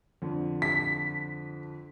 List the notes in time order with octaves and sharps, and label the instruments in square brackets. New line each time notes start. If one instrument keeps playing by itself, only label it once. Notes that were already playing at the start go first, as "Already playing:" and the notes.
[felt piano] F2 D3
[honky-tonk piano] B6